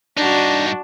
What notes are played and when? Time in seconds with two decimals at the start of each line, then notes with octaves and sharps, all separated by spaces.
0.17 G2 D4 D#4 F#4